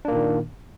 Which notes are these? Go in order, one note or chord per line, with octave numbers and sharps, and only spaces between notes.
A#2 D#3 A#3 D4